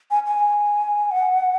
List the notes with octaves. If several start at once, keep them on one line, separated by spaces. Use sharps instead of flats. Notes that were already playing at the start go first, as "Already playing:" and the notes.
G#5
G#5
F#5